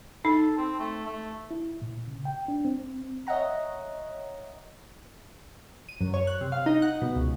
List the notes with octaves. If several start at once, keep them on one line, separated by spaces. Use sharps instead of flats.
D#4 A4
C4
A3
A3
E4
A#2
C#3
G5
D4
C4
C#5 D#5 E5 F#5 A#5
D#7
F#2
C#5
F#6
C3
F5
D#4
F#5
B2
C#2